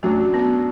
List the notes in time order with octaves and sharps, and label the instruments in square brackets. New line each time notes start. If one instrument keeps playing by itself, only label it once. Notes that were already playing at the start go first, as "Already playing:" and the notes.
[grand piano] F#2 F#3 D4 F#4 [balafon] A3
[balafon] B3